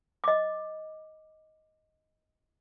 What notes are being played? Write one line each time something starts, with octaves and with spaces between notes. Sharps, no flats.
D#5 D6